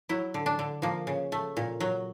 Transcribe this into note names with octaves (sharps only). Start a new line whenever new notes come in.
F#3 E4
D3
D4
D3
F3 A#3
C#3
A3
A#2
F#3